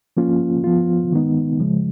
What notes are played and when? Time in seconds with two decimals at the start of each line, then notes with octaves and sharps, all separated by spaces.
0.17 F3 A#3 C#4 F4
0.64 F3 B3 F4
1.12 D#3 G#3 B3 D#4
1.60 C#3 F3 G#3